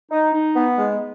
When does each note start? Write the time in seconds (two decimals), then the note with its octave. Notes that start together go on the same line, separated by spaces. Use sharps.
0.11 D#4
0.33 D#4
0.56 B3
0.78 G#3